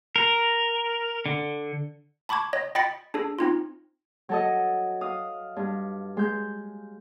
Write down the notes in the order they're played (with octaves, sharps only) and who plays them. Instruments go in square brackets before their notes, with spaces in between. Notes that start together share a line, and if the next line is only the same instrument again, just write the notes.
[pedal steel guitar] A#4
D3
[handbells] A5 B5 C#6 D6 G#6
C#5 D#5
D#5 G5 B5 A6 B6 C#7
D4 G#4 A4
C4 D#4 F4
[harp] F#3 A4 D#5
F5 D#6
G2
G#3 G6